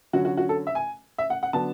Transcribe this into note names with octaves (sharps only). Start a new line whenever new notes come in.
D3 F#3 C#4 F#4
F#4
F#4
A4
E5
G#5
E5
F#5
F#5
D3 F#3 B3 D4 A5